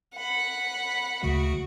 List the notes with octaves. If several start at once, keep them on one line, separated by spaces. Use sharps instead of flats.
F#5 B5
D2 C#3 A3 F#4